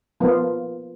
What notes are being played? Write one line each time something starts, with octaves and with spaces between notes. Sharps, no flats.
F3 A#3 B3 F4